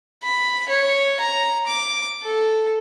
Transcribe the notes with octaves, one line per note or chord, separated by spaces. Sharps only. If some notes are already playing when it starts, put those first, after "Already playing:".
B5
C#5
A#5
D6
A4